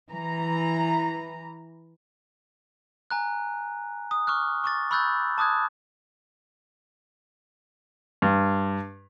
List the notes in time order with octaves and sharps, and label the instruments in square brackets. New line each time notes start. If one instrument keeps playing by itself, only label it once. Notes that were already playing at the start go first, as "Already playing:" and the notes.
[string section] E3 A#5
[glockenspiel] G#5 A#5 F#6
D#6
C#6 D6 F6 F#6
C#6 D6 A6
B5 C#6 E6 F#6 G6 A6
A5 D6 D#6 F#6 G#6
[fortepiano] G2